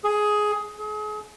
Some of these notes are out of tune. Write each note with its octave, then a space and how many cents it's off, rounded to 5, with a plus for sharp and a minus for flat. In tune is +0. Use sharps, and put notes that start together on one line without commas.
G#4 +10
G#4 +35